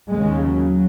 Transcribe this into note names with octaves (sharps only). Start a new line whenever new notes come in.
D#2 C#3 G#3
F#3